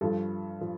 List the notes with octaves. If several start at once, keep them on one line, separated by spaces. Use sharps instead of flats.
G2 F3 A4
F3